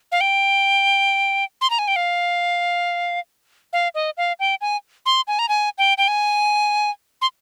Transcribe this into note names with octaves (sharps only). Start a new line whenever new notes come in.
F5
G5
C6
A#5
G#5
G5
F5
F5
D#5
F5
G5
G#5
C6
G#5
A#5
G#5
G5
G5
G#5
C6